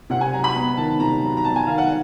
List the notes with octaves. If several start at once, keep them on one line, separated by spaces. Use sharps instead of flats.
C3 F#5
G#5
F#3 A#5
B5
B3
D#3 A5
C3 A#5
F#3
A#5
B3 A5
G#5
D#3 F5
F#5